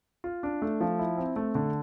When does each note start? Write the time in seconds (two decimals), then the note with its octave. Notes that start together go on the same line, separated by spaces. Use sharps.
0.24 F4
0.43 D4
0.62 A3
0.81 F3
0.99 E4
1.18 C4
1.36 A3
1.55 D3